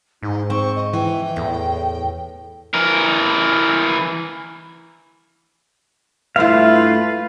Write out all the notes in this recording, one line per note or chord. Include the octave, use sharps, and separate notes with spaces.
G#2 D#4
C4 C#6
D#5
E3 G5
E2 A2
E3 A#4
G2 A3 E4 F4 B4 F5